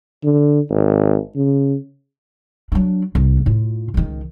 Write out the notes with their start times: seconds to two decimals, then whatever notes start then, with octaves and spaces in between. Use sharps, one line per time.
0.24 D3
0.70 G#1
1.36 C#3
2.72 F#3 D4
3.15 C2
3.46 A2 F4
3.94 C#2 D#3